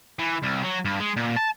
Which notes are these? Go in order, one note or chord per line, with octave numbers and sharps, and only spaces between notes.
E3
C2
F#3
G2
G#3
A#2
A5